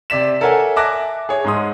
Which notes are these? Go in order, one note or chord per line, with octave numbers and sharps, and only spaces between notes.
C3 D5 B6 E7
A4 A#4 C#5 E5 F#5 G#5
E5 G#5 A5 D6 F#6 A#6
G#4 C#5
G#2 G#3 C6 D#6